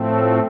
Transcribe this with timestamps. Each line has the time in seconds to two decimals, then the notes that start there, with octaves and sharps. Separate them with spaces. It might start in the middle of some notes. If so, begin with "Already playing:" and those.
Already playing: A2 F3 A3 C4
0.11 A4